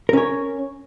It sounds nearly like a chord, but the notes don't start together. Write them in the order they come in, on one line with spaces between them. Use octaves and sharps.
A#4 C#4 C#5